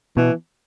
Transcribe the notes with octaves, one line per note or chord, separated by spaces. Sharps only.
B2 E3